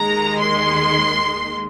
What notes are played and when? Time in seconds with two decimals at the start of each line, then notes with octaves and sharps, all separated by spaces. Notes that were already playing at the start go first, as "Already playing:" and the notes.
Already playing: D#2 D#3 G#3 A#5
0.40 C6